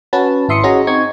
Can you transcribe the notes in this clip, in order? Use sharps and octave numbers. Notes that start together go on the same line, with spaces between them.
C#4 F#4 B4 A5
G#1 E4 E5 C6 D#6 C#7
C#4 F#4 G#4 D#5 A#5
C4 D#4 C#6 G#6